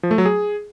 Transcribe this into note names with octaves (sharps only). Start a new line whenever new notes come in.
F3
A3
F#3
G#4